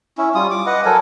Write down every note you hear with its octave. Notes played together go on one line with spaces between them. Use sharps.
C#4 E4
G3 F4 D#6
D6
B4 D#5 F#5
F#3 A4 A#4 G#5